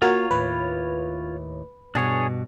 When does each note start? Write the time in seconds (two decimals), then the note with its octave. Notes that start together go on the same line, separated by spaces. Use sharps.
0.02 A#3 F4 F#4 A#4 C#5
0.31 D#2 A2 B4
1.95 G2 B2 D4 G#4 C#5